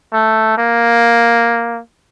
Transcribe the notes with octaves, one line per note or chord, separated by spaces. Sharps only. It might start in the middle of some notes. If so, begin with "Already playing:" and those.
A3
A#3